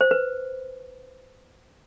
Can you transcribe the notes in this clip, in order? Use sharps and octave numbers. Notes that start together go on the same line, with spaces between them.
C5
B4